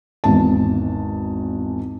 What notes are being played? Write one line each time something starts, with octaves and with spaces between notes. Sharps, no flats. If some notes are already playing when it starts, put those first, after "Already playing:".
G#1 E2 G#2 A5